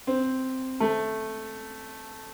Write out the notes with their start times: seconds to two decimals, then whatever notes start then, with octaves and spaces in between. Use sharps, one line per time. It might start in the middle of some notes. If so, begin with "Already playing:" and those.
0.07 C4
0.80 A3